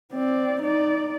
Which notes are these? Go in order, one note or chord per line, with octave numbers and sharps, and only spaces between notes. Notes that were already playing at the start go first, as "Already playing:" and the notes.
C4 D5
D#4 D5